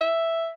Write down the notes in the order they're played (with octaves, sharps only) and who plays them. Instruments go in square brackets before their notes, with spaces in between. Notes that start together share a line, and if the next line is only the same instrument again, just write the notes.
[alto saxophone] E5